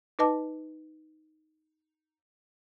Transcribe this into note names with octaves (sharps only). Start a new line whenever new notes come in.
D#4 B4 D#5 A5 D6